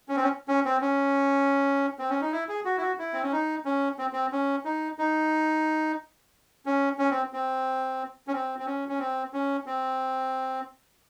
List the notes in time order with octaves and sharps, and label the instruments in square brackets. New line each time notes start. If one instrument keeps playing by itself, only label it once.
[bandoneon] C#4
C4
C#4
C#4
C4
C#4
C4
C#4
D#4
E4
G#4
F#4
E4
F#4
E4
C4
C#4
D#4
C#4
C4
C4
C#4
D#4
D#4
C#4
C#4
C4
C4
C#4
C4
C4
C#4
C#4
C4
C#4
C4